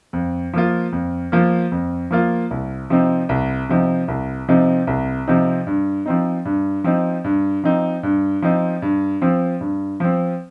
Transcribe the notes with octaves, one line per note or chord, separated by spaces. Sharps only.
F2
F3 A#3 F4
F2
F3 A#3 F4
F2
F3 A#3 F4
C2
C3 F3 C4 D#4
C2
C3 F3 C4 D#4
C2
C3 F3 C4 D#4
C2
C3 F3 C4 D#4
G2
F3 C4 D#4
G2
F3 C4 D#4
G2
F3 C4 D#4
G2
F3 C4 D#4
G2
F3 C4
G2
F3 C4